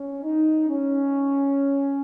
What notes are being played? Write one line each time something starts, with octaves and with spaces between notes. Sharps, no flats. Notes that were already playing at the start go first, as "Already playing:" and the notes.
Already playing: C#4
D#4
C#4